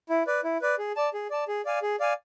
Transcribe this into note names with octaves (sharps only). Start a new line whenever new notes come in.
E4
B4 D5
E4
B4 D5
G#4
D5 A5
G#4
D5 A5
G#4
D5 F5 G#5
G#4
D5 F5 G#5